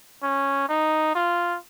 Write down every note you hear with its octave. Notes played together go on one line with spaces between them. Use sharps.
C#4
D#4
F4